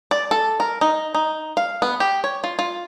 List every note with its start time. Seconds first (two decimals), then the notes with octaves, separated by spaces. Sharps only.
0.11 D5
0.31 A4
0.60 A#4
0.81 D#4
1.15 D#4
1.57 F5
1.82 B3
2.00 G4
2.24 C#5
2.44 F4
2.59 F4